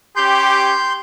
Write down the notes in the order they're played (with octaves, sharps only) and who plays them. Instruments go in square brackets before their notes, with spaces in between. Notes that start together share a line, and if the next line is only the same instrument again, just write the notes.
[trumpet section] C#4 G4 [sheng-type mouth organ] C6 G6